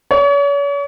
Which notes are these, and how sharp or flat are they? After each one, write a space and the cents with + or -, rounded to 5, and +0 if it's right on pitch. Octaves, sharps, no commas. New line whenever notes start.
C#5 +40